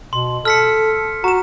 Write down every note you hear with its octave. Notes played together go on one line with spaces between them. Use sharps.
B2 C6
A4 F6 B6 C#7
F#4 A#5 E7